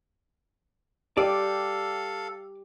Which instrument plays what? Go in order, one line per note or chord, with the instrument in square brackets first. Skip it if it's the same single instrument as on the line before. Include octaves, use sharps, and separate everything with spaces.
[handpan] G4 [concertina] A4 F5 [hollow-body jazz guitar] D5